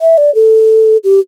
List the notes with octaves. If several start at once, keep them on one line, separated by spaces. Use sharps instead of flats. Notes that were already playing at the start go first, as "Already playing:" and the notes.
E5
D5
A4
G4